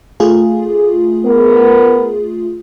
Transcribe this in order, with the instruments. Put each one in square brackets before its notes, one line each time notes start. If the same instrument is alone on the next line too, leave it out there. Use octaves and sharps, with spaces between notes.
[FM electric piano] A3 F4 G#4
[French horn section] B3 A#4